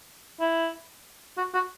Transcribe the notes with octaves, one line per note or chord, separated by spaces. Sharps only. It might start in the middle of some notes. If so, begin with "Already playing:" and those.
E4
F#4
F#4